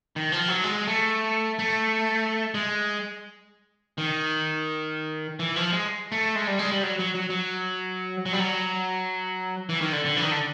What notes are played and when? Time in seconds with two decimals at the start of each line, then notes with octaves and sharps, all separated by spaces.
0.16 D#3
0.32 F3
0.48 F#3
0.64 G#3
0.87 A3
1.59 A3
2.54 G#3
3.98 D#3
5.39 E3
5.56 F3
5.72 G#3
6.12 A3
6.36 G#3
6.47 G3
6.59 G#3
6.72 G3
6.83 F#3
6.99 F#3
7.15 F#3
7.30 F#3
8.26 F#3
8.33 G3
8.40 F#3
9.69 E3
9.81 D#3
9.92 D3
10.05 D3
10.17 E3
10.23 D#3
10.31 D3